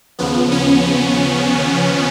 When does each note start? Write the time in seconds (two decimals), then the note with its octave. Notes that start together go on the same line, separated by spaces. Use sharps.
0.19 D#2 C#3 F3 B3
0.51 C#4